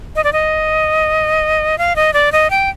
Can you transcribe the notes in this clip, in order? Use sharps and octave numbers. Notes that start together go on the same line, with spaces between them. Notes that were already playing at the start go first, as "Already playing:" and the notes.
D#5
D5
D#5
F5
D#5
D5
D#5
G5